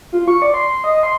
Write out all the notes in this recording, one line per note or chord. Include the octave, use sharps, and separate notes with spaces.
F4
C#6
D5
C6
C6
D#5
C6